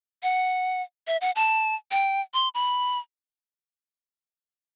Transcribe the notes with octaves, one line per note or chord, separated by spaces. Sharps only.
F#5
E5
F#5
A5
G5
C6
B5